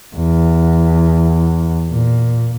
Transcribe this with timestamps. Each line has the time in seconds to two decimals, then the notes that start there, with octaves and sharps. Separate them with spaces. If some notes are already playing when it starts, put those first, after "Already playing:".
0.16 E2
1.92 A#2